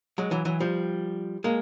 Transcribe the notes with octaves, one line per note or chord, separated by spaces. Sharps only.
F#3 G#3
E3 F#3
E3 F#3
F3 G3
G#3 A#3